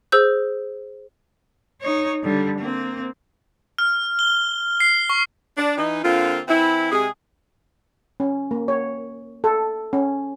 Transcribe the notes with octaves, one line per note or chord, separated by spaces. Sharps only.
G#4 C5 E6 G6
D#4 C#5
D3 G3
A#3 C4
F6
G7
C7
C#6
D4
E3 D#4
D3 A#3 C4 F4
E3 C4 E4
C3 G#3 G#4
C#4
A#3
C#5
A4
C#4